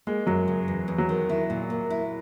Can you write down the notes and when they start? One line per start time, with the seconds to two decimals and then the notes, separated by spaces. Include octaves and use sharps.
0.07 G#3 A#3
0.27 F#2 F#3
0.48 C#3
0.68 E2
0.88 E2
0.98 F#3
1.09 D#3
1.29 E4
1.50 A#2
1.70 A#3
1.90 E4